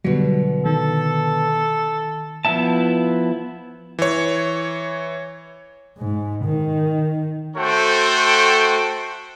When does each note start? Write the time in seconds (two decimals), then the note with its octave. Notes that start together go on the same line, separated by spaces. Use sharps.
0.04 B2 D3 F#3 G3
0.66 D#3 A4
2.45 F3 B3 E4 E5 A5
3.99 E3 C#5
5.98 G#2
6.45 D#3
7.56 A3 F#4 A4 C5 G5